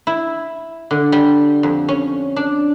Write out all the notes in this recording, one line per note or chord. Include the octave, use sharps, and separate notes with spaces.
E4
D3
G3
F2
C#4
D4